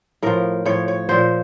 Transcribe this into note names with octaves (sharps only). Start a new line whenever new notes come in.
A2 F3 A#4
A2 F3 C#5
C#5
A#2 F3 C5